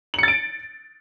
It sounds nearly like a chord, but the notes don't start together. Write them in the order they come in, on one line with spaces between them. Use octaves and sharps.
F#7 C#7 A6 D7